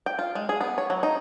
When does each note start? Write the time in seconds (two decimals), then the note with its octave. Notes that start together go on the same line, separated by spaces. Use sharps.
0.06 G5
0.19 F4
0.35 G#3
0.49 G#4
0.61 B3
0.78 C#5
0.90 F#3
1.03 D#4